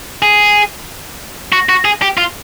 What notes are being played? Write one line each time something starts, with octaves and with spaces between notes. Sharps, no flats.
G#4
F#4
F#4
G#4
G4
F4